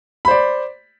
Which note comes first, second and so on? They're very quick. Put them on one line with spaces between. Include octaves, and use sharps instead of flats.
B5 C5 D5